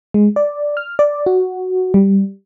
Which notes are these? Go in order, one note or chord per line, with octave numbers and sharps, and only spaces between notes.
G#3
D5
F6
D5
F#4
G3